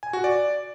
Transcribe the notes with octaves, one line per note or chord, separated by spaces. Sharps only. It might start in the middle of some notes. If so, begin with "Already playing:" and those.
G#5
F#4
D5